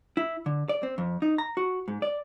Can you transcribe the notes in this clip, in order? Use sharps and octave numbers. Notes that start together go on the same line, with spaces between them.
E4
D3
D5
C4
F2
D#4
A#5
F#4
G#2
D5